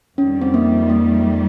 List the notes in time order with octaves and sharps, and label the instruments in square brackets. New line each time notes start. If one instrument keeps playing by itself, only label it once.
[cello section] F2 D#3 G3 [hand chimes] C#4
[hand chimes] C4
A#3
A#3